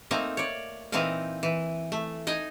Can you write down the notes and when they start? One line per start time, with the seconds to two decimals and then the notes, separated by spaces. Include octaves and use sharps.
0.11 A3 A#3 C4 D#4
0.37 C#5 D5
0.92 A#2 E3 C4 D#4 D#5 F5
1.43 E3
1.92 A3
2.27 D#4 D#5 G#5